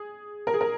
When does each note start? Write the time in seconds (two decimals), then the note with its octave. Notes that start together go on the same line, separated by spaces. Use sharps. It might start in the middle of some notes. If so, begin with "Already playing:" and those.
Already playing: G#4
0.47 A#4
0.54 G#4
0.61 A#4